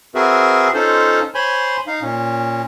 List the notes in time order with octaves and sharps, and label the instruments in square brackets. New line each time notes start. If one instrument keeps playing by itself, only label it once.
[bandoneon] C4 F#4 G#4 A#4 B4 E5
C#4 D#4 F4 A4 C5
C5 C#5 G#5 B5 C6
D#4 F5
A#2 C#4